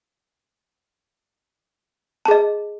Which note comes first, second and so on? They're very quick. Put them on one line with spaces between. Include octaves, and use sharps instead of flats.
A5 G#4 D#5